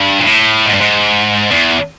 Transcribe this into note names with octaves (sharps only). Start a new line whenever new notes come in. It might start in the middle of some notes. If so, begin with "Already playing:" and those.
Already playing: G2
A#2
A2
G#2
G2
G#2
E2